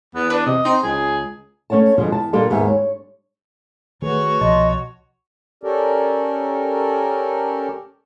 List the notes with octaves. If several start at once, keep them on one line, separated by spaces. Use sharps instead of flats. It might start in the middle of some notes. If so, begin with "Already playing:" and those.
E2 B3
D4 B4
C3 D#5
C4 D#4
C#2 G#4
A3 C#4 C#5 F#5 A5
B2 D3 F3 G3 G#3 B3
E2 A5
A#2 G3 D4 F4 G4 A4
D#2 G#2 B3 E5
C#5
D#3 A3 F#4 G#4 B4 C#5
C2 B2 F3 D#5 A5 C6 A6
C#4 G4 A4 A#4 D5